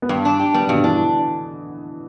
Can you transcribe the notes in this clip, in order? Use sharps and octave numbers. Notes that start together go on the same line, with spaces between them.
B3
G2 D4
D4
G4
G3 B3
G2 B2
D3
E3 D4